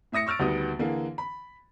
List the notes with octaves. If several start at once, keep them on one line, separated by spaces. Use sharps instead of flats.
A2 E5 D#6 A#6 C#7
C#6 E6 F6 A6 D7
D2 D#3 G3 B3 F#4 D#6
D3 E3 A#3 G#4
B5